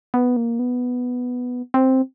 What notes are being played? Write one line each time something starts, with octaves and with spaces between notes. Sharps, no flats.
B3
A#3
B3
C4